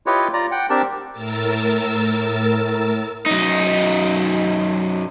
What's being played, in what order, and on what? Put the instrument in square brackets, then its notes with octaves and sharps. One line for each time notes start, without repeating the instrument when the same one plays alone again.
[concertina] E4 F4 G4 B4 C#5 D#5
F4 D5 A#5
F#5 G5
C4 D4 G4 A#4 A5
[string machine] A2 A#4 E6 A6
[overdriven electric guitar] F#2 D#4